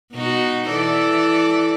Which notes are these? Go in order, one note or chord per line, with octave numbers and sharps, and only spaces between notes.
B2 D#4 F#4
E3 A4 D5